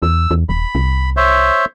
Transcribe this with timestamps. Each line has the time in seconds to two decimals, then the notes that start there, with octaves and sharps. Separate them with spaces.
0.02 E2 E6
0.31 E2
0.49 D#1 B5
0.75 C2
1.17 C5 C#5 E5